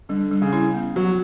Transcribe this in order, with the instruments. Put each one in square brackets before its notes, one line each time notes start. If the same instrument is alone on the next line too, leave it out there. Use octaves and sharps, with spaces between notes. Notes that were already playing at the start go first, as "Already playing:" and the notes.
[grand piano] D3 [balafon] G3
[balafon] G3
[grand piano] C#3
[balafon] E4
B3
[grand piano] F#3 [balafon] B3